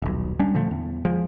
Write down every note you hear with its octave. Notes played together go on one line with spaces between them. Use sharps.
D#1 B1
G3 C#4 D4
A#2 D3 F3 A3
E2
F3 G#3